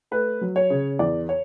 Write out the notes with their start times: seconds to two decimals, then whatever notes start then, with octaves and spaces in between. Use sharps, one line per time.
0.11 A3 B4
0.41 F#3
0.56 C#5
0.70 C#3
0.99 E2 D5
1.29 C#5